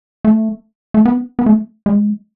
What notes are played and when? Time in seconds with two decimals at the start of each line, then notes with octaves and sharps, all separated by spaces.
0.25 A3
0.94 A3
1.05 B3
1.39 B3
1.46 A3
1.86 G#3